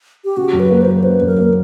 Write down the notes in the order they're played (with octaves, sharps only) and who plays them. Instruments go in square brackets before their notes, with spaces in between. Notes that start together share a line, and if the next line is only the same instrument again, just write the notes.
[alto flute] G4
[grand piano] C#3 [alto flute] F#4
[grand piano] F#2
[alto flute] B4
[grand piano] A#3
[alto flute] C5
[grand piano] F#3
[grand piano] C#3 [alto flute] B4
[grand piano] F#2 [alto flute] A#4
[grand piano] A#3